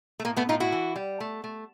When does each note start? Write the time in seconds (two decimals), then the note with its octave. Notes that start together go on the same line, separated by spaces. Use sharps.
0.20 A3
0.25 A2 A#3
0.37 A3 B3
0.49 A2 D#4 F4
0.60 E4 F#4
0.72 E3
0.96 G3
1.20 A3
1.44 A3